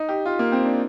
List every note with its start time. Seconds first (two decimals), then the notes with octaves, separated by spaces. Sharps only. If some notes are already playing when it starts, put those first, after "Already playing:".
Already playing: D#4
0.09 G4
0.26 F4
0.39 A#3
0.52 C4
0.65 D4